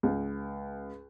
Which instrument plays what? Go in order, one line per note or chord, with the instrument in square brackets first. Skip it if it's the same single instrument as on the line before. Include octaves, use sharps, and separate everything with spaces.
[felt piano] C#2